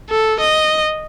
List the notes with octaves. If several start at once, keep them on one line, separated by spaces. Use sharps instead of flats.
A4
D#5